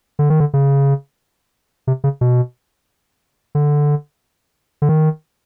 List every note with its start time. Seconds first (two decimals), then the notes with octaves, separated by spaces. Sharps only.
0.19 D3
0.30 D#3
0.40 D3
0.54 C#3
1.87 C3
2.04 C#3
2.21 B2
3.55 D3
4.82 D3
4.89 D#3